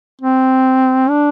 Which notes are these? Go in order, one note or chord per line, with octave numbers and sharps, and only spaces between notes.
C4
D4